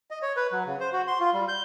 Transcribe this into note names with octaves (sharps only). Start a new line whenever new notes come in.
D#5
C#5
B4
F#3
C#3
C5
F#4
C6
F4
G3
G6